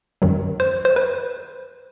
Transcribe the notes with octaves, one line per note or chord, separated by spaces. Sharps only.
F#2 D#3 F#3
C5
C5
B4